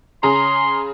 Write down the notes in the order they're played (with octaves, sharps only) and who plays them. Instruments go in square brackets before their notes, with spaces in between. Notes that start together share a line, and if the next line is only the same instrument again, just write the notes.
[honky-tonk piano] C#3 G#4 A#5 [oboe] C6